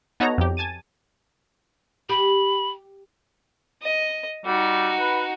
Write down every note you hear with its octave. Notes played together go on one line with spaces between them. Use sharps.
B3 D#4 F#4 A4 C#5 A#5
F2 G4
G#5 A5 A6 D#7
G4 B5
D#5
G3 D#4 F#4
B4